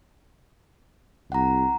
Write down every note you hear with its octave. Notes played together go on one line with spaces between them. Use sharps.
C2 F#5 A#5